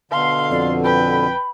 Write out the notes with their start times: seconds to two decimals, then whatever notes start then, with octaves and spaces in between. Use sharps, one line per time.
0.12 B2 D3 F5 C6
0.51 F2 D5
0.84 B4 G5 B5